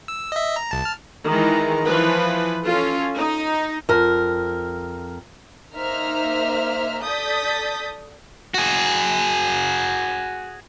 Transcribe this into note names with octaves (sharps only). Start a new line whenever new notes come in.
E6
D#5 E5
A#5
C2 A5
A5 F6
D#3 E3 G#3 A#5
E3 F3 B4
C#4 F4 A4
D#4
F2 A#4
A#3 D#4 C5 E5 A#5 F6
A4 D5 D#6 G6 A6 B6
F#4 G#4